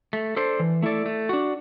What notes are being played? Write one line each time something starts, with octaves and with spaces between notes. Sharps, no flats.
A3
D4 A4 C5
E3
A3 E4 A4 D5
A3
D4 F#4